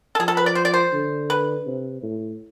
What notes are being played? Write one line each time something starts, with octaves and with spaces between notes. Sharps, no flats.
A4
F3 G#4
A4
B4
D5
C5
D5
C5
D3
B4
C3
A2